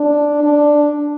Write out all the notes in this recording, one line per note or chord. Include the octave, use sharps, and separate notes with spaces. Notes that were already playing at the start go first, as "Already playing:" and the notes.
Already playing: D4
D4